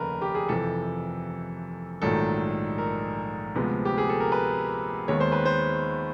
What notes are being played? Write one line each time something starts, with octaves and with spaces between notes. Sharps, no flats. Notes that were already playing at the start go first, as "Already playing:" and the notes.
Already playing: F1 D#2 C#3 A#4 B4
G4
G#4
F2 C3 E3 A4
A#1 G#2 D#3 F#3 A3 A4
A#4
D2 C3 F3 G#3 B3
G4
G#4
A4
A#4
B4
D#2 D#3 G#3 B3 C#5
C5
B4
C5